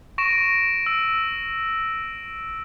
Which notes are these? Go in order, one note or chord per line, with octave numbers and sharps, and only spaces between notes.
C#6 A#6 D7 E7
E6